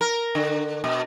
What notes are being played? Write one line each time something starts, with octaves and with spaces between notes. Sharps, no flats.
A#4
D3
B2